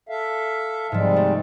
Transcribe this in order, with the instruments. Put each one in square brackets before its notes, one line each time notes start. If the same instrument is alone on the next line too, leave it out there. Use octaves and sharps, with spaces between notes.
[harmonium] A4 E5 F5
[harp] G#2 F3 [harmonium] C3 G3 G#3
[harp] A3